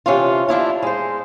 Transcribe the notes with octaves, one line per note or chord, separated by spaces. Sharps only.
C3 E3 C#4 D4 F4
F3 D4 E4 F4
G#3 C5